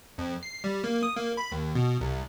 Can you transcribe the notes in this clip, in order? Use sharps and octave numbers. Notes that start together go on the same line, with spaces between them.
F2
C7
G3
A#3
D#6
A#3
B5
D#2
B2
C2